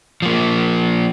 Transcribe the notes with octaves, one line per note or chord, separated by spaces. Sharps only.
F3 A#3